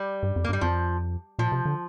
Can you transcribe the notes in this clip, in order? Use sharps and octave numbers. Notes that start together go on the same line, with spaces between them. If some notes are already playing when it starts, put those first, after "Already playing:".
Already playing: G3
G2
F2
A#3
G2
G3
F2 F3
A#2 F3
C3
D3